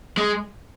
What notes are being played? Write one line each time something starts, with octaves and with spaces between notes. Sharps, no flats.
G#3